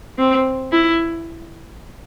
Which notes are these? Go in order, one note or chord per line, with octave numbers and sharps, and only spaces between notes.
C4
E4